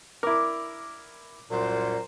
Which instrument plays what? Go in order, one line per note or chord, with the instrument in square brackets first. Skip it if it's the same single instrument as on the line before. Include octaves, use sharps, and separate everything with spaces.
[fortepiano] E4 A#4 [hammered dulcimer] D6
[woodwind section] C2 F#2 A#2 [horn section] F#3 A#4 C5